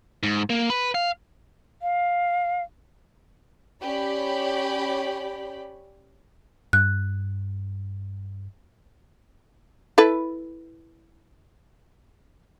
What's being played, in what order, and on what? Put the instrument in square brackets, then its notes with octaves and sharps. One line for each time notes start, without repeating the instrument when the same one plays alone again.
[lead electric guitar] G#2
A#3
B4
F5
[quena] F5
[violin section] C#4 G4 D5 B5
[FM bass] G2 [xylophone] F#6
[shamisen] E4 A4 B4